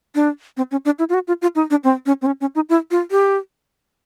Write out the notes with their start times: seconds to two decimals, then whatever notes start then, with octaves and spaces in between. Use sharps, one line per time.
0.15 D4
0.57 C4
0.71 C#4
0.85 D4
0.99 E4
1.09 F4
1.14 F#4
1.28 F4
1.42 F4
1.55 D#4
1.70 D4
1.84 C4
2.06 C#4
2.22 C4
2.26 C#4
2.41 C#4
2.55 D#4
2.69 E4
2.91 F4
3.11 G4